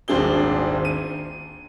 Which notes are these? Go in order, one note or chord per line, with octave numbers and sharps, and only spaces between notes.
D#1 G#1 C4 D4 G#4 G7
D#7